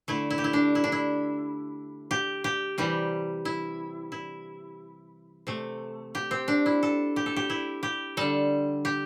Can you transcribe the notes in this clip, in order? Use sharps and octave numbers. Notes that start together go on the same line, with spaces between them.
D3 A3 E4
E4
G4
E4
D4
E4
D4
E4
G4
G4
C3 E3 G3 G4
E4
E4
C3 A3
G4
C4
D4
E4
A4
G4
A4
G4
E4
G4
D3 G3 A4
G4